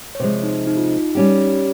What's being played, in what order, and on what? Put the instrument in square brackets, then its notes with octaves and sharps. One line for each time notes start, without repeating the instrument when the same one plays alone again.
[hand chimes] C#5
[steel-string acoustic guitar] C3 F3 G#3 [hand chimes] C5
[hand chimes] D#4
D#4
F4
D#4
[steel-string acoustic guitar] G3 C#4 G4